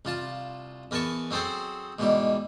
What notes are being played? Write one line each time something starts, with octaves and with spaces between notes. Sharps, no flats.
C2 F4 A5
E2 A#4 B4 G#5 A5 C#6
F#3 C4 G#4 A4 C5
G#2 B2 E3 G3